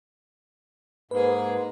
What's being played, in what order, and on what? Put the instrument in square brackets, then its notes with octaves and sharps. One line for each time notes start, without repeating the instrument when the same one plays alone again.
[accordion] G#2 [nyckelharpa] A#3 G#4 [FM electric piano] B4